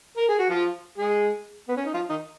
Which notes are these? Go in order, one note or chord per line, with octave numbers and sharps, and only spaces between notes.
A#4
G#4
F#4
F3 F4
G#3 G#4
B3
C#4
D#4
F3 F4
D#3 D#4